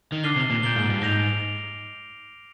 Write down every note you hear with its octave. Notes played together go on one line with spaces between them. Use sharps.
D#3
D3 D6 F6 C7 D#7 G7
C3
A#2
A#2 G6 D7 G7
G#2
G2
G#2 G6 A#6 D7 F7